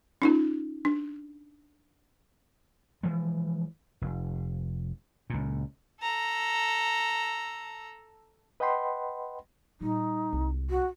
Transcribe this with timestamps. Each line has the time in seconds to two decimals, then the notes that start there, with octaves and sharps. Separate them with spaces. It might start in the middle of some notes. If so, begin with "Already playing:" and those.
0.22 C#4 D#4 F4
0.85 D4
3.03 E3 F3 G#3
4.02 F1
5.30 C#2 A#2
6.01 A4 A#5
8.60 B4 D#5 F#5 G5 B5 C6
9.81 A#2 G3 D#4
10.33 C2 G#3
10.70 F#4